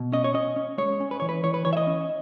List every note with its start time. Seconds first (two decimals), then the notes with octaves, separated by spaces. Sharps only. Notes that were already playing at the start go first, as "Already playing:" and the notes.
Already playing: B2
0.12 C#4 D#5
0.24 C#5
0.34 C#4 D#5
0.56 C#4
0.78 G#3 C#5
1.00 C#4
1.11 B4
1.20 E3 C#5
1.29 B4
1.43 E3 C#5
1.54 B4
1.65 E3 C#5
1.73 E5
1.77 D#5
1.87 C#4